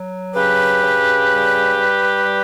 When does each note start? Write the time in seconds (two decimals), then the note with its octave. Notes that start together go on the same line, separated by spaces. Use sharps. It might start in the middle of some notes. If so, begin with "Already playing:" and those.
Already playing: F#3
0.35 C#3 G4 B4
0.82 C#3
1.28 G3
1.75 G3
2.22 G3